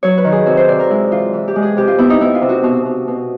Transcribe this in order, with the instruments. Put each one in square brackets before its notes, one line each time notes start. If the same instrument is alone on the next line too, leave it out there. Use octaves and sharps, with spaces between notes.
[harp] F#3 C#5
B4
D#3
G#4
C3 F#4
C5
C3 D5
A#4
G#3 E4
E3 F4
E3
G4
G#3
G#4
C3 G4
F4
B3 E4
D#4
B3 E4
F4
C3
F#4
B2 F#4
B2
B2